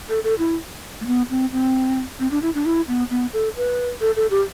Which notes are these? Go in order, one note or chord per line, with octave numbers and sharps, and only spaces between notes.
A4
A4
E4
A3
B3
C4
C4
C4
D4
E4
D4
E4
B3
B3
A4
B4
A4
A4
G4